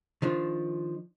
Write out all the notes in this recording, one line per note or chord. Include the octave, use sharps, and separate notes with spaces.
D#3 F3 D4